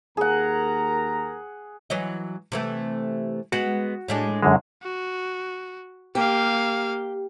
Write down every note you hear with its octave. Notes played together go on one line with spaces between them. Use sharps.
D#2 G#4 A#4 F#5 A#5
E3 F#3 D#5
C3 E3 A3
G#3 B3 F#4 B4
A2 G#3 D4
F#2 D3 G#3
F#4
A#3 G4 F5